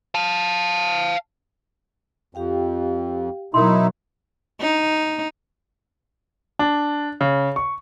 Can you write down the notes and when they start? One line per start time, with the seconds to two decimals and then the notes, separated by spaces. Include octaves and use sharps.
0.15 F5 A5
2.35 F2 G4 F5 G5
3.54 B2 F#3 D#4 E4 A#4 C6
4.61 D#4
6.59 D4
7.21 C#3
7.56 C#6